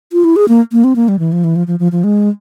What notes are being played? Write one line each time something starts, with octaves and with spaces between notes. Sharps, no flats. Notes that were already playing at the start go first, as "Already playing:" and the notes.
F4
E4
G#4
A#3
A#3
C4
A#3
G3
E3
F3
E3
F3
F3
F3
F3
G#3